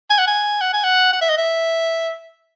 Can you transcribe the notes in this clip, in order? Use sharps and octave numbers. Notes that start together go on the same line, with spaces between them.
G#5
F#5
G#5
F#5
G#5
F#5
F#5
E5
D#5
E5